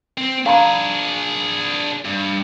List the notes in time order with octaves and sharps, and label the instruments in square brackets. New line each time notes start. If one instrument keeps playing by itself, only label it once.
[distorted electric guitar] C4
[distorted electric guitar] D4 G#4 [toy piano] F5 A#5 B5
[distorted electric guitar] G2